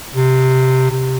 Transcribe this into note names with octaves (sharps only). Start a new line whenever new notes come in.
C3
C3